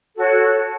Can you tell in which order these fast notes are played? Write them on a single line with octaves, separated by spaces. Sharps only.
A4 F#4 C#5